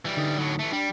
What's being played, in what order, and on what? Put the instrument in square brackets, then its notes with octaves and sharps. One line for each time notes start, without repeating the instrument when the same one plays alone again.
[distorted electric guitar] E3 G3
[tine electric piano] D3 D#4 D#6
[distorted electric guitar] A2 F#3
E3 A3
[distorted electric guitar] G3 [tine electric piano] D4